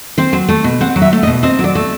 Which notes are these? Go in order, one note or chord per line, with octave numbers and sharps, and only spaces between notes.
C4 C5
F#3
A3
B2
C4 F#5
F#3
E5
A3
D#5
B2
C4 D#5
F#3
D5
A3